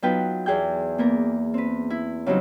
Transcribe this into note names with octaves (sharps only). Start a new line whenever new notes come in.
F#3 B3 D#4 F4 B4 G5
E2 G#4 G5 G6
A#3 B3 A#4
C4 B4
E4
C#3 F#3 G3 C4 D#4